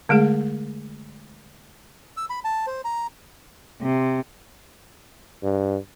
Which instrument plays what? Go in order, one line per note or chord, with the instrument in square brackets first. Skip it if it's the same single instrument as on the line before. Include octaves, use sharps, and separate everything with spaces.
[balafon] D3 G#3 A3 G#4
[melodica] E6
B5
A5
C5
A#5
[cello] C3
[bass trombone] G2